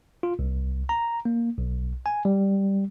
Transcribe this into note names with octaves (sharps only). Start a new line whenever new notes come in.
F4
C2
A#5
A#3
B1
G#5
G3